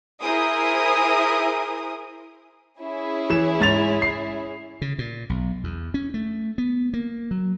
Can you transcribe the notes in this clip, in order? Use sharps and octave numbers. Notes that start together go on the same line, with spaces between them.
E4 G#4 A#4 C5 D#6
C#4 E4 G#4
E3 E7
G#2 A6 F7
C7
C#3
A#2
B1
E2
C#4
A3
B3
A#3
F#3